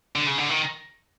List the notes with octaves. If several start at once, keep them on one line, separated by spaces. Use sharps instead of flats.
D3
C#3
D3
D#3